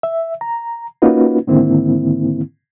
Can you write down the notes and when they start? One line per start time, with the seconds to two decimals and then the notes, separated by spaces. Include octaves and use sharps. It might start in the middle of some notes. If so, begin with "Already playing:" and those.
0.03 E5
0.41 A#5
1.02 A#3 C#4 D#4 F4 F#4 B4
1.47 G#2 D3 D#3 A#3 C4 E4